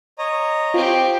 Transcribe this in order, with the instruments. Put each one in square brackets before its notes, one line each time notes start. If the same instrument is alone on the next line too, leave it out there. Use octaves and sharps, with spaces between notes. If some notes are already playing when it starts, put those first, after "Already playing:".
[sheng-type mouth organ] C#5 D#5 A#5
[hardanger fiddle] C4 G4 [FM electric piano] F4